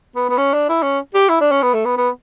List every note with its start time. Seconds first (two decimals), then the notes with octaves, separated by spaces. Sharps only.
0.16 B3
0.29 B3
0.38 C#4
0.54 D4
0.69 E4
0.83 C#4
1.14 G4
1.29 E4
1.41 D4
1.51 C#4
1.62 B3
1.74 A3
1.85 B3
1.97 B3